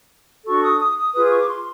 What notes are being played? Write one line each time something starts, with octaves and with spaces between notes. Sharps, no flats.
D4 F#4 A4 C#6
D#6
D#6
D#6
F4 G#4 B4 D#6
D6
C#6
D6
C6